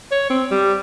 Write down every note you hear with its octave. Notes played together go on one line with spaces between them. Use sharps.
C#5
C4
G3